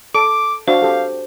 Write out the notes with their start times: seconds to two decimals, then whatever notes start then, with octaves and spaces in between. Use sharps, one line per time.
0.15 A4 D6 D7
0.68 D4 F#4 C5 F5
0.82 G4 A4